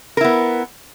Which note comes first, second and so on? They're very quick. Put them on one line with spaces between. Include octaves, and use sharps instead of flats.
A#4 E4 B3